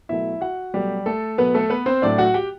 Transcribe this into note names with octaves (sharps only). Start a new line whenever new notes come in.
B2 F#3 A3 E4 E5
F#4 F#5
B2 F#3 G3 A3 G4
A3 A4
B2 F#3 A3 B3 B4
A3 A4
B3 B4
C4 C5
A2 F#3 A3 D4 D5
F#4 F#5
G4 G5